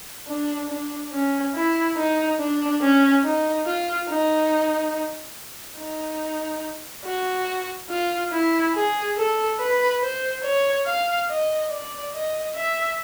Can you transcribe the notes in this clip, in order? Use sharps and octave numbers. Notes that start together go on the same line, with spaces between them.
D4
D4
C#4
E4
D#4
D4
C#4
D#4
F4
D#4
D#4
F#4
F4
E4
G#4
A4
B4
C5
C#5
F5
D#5
D5
D#5
E5